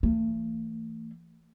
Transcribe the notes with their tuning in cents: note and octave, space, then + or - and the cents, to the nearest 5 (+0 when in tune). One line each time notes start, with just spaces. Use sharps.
E3 +0 A3 +40